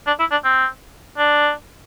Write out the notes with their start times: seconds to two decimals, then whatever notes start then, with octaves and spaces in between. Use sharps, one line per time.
0.07 D4
0.20 E4
0.31 D4
0.44 C4
1.18 D4